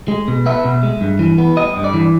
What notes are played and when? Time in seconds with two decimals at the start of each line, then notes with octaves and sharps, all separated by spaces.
0.08 G#3
0.28 B2
0.46 B3 E5
0.65 B2
0.83 G#3
1.01 G2
1.19 E3
1.38 B3
1.57 G3 D#5
1.76 G2
1.84 D5
1.94 E3